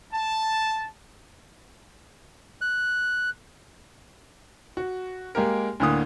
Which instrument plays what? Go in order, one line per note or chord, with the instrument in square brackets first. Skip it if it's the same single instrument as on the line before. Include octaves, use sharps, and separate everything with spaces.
[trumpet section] A5
[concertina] F#6
[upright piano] F#4
G#3 A#3 G4 A#4
D2 A2 D3 A#3 D#6